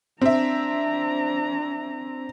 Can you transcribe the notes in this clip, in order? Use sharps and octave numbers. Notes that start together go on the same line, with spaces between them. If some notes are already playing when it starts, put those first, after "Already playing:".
C4 D4 E5 A#5